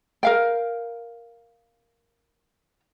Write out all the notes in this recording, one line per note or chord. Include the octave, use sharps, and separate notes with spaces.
A#4 F5 G5